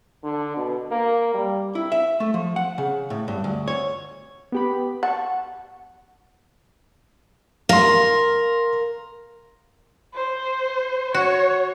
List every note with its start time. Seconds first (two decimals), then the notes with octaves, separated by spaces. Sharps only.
0.24 D3
0.57 B2
0.91 A#3
1.34 G3
1.75 E4
1.92 E5
2.20 A3
2.34 F3
2.56 F#5
2.78 C#3
3.10 A2
3.28 G2
3.44 D2
3.68 C#5
4.52 B3 G4 B5
5.03 F#5 A5 C#6
7.69 A#4 F5 C6
10.15 C5
11.14 F#4 C#5